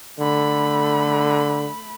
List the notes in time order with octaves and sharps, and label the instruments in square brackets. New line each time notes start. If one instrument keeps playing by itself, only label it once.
[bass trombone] D3 [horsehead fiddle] A3 B5